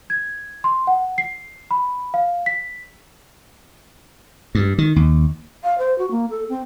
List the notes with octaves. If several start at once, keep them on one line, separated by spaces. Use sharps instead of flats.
G#6
C6
F#5
C7
B5
F5
B6
G2
D#3
D#2
F5
C5
F#4
A#3
A4
C4